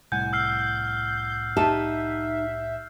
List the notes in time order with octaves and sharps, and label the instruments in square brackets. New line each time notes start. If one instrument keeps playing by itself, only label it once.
[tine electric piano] C2 A2 F#5 [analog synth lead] G#5 [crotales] G6
[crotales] E6 F6 C7 [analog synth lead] G6
[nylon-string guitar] D#4 G4 A5 [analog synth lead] E5